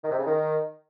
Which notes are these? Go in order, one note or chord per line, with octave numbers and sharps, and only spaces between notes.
D#3
C3
C#3
D#3